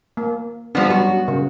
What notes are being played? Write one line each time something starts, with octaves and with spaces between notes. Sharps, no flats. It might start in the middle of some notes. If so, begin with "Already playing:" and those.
A#3
F3 G3 B3 D4
F#3 F#4
C#3